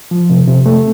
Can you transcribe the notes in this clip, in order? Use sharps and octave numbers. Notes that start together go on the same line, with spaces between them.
F3
C3
C3
A3